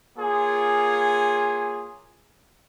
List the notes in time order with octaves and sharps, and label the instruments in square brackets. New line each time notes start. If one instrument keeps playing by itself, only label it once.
[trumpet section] A#3 F4 G#4 C#5 G#5